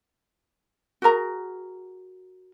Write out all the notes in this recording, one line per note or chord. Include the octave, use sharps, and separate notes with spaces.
F#4 G#4 A#4 A#5